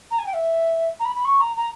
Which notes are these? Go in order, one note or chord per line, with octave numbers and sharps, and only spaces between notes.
A#5
G#5
G5
E5
A#5
B5
B5
C#6
A#5
A#5